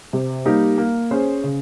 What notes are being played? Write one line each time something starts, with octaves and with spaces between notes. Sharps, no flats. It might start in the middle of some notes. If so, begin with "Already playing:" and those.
C3
G3 A#3 D#4 G4
A#3
C#4 G#4 C5
C#3